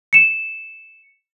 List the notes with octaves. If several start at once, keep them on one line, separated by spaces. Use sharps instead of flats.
C#7 E7